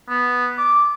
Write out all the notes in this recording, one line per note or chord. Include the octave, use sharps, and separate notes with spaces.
B3
D6